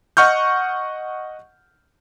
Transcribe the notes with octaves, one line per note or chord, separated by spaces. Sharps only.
D#5 F#5 C#6 F6 G6